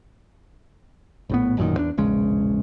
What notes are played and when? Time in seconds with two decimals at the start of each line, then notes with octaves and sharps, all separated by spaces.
1.29 A#1 A2 B3
1.57 A1 F#2 A#2 D#3
1.76 E2 C4 D4
1.97 E1 A#1 C#3 G#3